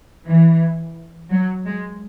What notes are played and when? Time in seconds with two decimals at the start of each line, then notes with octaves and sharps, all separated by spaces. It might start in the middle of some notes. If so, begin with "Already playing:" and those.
0.27 E3
1.31 F#3
1.65 G#3